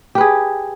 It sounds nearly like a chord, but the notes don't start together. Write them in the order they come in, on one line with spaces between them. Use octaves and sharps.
G4 B4 G#4